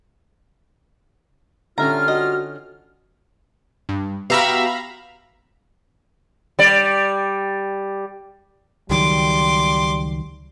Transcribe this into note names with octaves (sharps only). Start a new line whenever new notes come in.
D3 G3 C#4 F4 E5 A#5 F6
F#4 D#5
G2
B3 F#4 G4 E5 F5 A#5 B5
G3 D5
C#2 D#3 F#3 G3 C6 D6